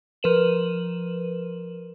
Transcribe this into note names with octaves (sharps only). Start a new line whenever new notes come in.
F3 A#4 B4 D#7 E7 F#7